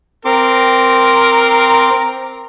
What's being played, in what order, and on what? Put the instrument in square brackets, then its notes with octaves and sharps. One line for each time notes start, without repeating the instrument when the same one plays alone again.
[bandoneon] C4 C6 D6 [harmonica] A#4